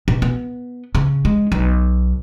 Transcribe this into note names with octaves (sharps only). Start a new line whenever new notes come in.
B2
B3
C#3
G#3
B1